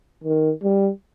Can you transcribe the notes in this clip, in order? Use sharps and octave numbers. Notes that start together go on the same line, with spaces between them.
D#3
G3